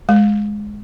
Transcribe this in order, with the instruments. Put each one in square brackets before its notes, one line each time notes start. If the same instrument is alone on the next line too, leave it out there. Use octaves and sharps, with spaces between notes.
[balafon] G#3